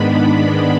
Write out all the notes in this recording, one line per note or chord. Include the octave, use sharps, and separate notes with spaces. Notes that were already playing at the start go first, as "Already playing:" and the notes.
Already playing: G#2 D#3 G#3 B3 D4 B5